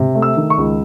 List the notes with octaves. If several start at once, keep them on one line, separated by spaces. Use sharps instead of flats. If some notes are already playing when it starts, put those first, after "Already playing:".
Already playing: C3
A3
E6
D#3
C#6
C#2